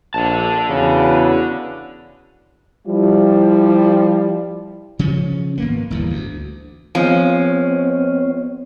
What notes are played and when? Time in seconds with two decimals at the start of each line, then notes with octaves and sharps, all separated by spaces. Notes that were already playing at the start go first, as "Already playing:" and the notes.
0.14 A#1 D3 A5
0.69 E2 C#3 F#4 B4
2.87 F3 G3 E4
4.99 C#3 F3 C#4
5.58 G#1 A#3 B3
5.91 G1 E2 A2
6.10 D2
6.95 F3 G#3 B3 C4 C#5